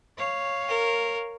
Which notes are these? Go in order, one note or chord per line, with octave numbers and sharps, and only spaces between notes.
C#5 F5
A#4